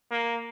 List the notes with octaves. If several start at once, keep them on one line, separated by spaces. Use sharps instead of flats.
A#3